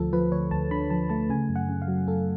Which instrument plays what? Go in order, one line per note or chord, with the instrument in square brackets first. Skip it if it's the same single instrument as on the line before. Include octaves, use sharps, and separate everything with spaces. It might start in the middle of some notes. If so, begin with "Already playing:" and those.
Already playing: [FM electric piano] D2 F3 A4
F3 B4
D2 C#5
D2 A5
D3 B5
F3 A5
A3 A5
C#3 G#5
F#2
F#5
C#3
F5
F#3
F#2 A4